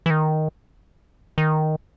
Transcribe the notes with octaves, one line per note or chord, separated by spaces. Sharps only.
E3
D#3
D#3